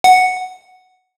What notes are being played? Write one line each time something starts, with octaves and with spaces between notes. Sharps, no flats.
F#5